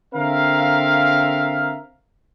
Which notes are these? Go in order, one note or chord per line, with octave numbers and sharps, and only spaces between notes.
D3 C4 A#4 E5 F5